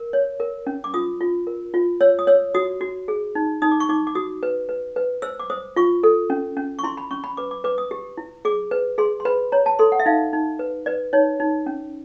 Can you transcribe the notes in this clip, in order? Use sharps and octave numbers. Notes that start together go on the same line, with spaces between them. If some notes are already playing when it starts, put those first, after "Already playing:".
Already playing: A#4
C#5
A#4
C#4
D6
F4 D#6
F4
A#4
F4
C#5 E6
D#6
C#5 E6
F#4 D#6
F#4
G#4
D#4
D#4 D#6
D6
C#6
D#4 D6
D6
F#4 D#6
B4
B4
B4
C5 E6
D6
C5 D#6
F4 C#6
A4
C#4
C#4
C#6
E4 C6
B5
C#4 C#6
B5
B4 D6
D6
B4 D6
D#6
G4
E4
G#4 D6
B4
G#4 C6
C6
B4 B5
C#5 A#5
A5
A4 C6
F#5
E5
D#4 F5
D#4
B4
B4 D5
D#4 C#5
D#4
C#4